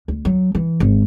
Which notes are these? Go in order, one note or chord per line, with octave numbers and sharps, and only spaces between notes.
D2
F#3
E3
G#1